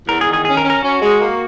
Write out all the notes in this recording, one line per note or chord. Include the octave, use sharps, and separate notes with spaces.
E2 A#4
G#4
D#3
G#4
C#4 G#4
A#4
C#4
A#4
C#4 F#4
G#3
A#3